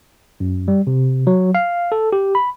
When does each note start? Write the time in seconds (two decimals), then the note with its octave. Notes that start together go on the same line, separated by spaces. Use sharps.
0.40 F#2
0.68 G3
0.87 C3
1.27 F#3
1.55 F5
1.92 A4
2.13 G4
2.35 B5